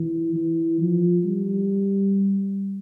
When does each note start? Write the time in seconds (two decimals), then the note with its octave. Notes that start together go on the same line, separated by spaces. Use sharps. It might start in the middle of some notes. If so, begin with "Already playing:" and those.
Already playing: E3
0.36 E3
0.80 F3
1.24 G3